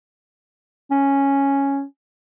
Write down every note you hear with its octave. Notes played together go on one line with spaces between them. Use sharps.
C#4